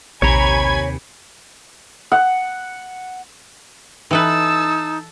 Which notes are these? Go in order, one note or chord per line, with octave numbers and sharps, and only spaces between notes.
A#1 D#2 C3 C#5 G#5 A#5 B5 G#6
F#5
E3 D#4 A4 B4 A5 E6